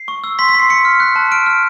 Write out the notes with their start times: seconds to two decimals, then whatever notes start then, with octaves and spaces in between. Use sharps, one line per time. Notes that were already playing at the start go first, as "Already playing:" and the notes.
Already playing: C7
0.08 C#6
0.24 E6
0.39 C6 B6
0.49 B6
0.55 C6 C7
0.69 C6 C#7
0.85 F6
1.00 F#6
1.16 A5
1.32 F6 D7
1.46 F6